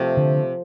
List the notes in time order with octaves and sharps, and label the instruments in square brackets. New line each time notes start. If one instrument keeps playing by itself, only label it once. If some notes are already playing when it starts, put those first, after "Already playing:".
Already playing: [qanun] C3 F3 A3
[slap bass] D3